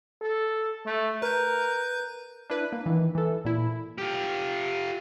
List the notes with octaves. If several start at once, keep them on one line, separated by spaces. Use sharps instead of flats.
A4
A3
A#4 B4 G6
D4 E4 B4
A#3
D#3 E3
E3 A4
A#2 E4
F4 G4